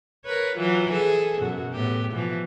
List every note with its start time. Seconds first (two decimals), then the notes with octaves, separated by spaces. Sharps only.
0.25 A#4 B4 C#5
0.56 E3 F#3 F4
0.92 G#4 A4
1.41 F#2 B2 F#4
1.73 A2 B3 G4
2.13 B2 E3 F3